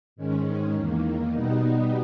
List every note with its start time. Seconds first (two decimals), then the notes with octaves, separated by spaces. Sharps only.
0.16 G#2 D#3 G#3 C#4
0.74 E2 D#3 A#3
1.31 B2 G3 B3 D#4